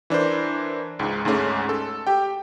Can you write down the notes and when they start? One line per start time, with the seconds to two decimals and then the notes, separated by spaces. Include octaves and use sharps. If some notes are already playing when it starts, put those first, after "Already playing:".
0.10 E3 D4 A#4 C5
0.99 C#2 G#2
1.25 D2 G#2 G#3 A3 C#4
1.69 A4
2.07 G4 G5